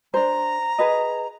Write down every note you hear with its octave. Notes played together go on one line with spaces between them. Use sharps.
D4 C5 A#5
G#4 B4 D#5